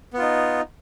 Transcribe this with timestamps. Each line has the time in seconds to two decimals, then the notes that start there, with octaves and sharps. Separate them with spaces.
0.14 B3
0.18 F4
0.22 D#4